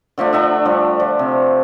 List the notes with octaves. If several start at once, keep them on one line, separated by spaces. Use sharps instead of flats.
D3 F3 A3 D4
D4 E5 F#5 B5
F3 G3
F3
C3